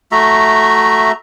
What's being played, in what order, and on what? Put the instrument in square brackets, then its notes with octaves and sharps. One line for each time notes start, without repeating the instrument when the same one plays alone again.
[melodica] A3 F#4 E5 A#5